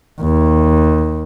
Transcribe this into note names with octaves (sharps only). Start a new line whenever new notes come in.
D#2